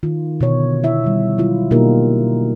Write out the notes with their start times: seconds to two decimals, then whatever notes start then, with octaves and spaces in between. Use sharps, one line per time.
0.03 D#3 F4
0.41 B2 D3 C#5
0.84 E4 E5
1.04 D#3 G3
1.38 F#3 E4 F4
1.71 B2 A#3 D#4 F4 G4 A#4